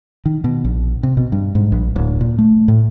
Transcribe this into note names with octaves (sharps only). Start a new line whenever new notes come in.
D#3
B2
A#1
C3
B2
G2
G#2
A#1
D1
A#2
A3
A2